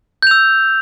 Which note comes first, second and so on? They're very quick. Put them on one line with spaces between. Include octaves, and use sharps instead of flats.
G6 F7 E6